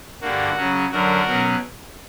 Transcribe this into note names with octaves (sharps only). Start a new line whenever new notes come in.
G2 D3 A#3 F#4
C#3 F#3 C#4
F#2 D3 F#3 F#4 A#4
B2 F#3 C#4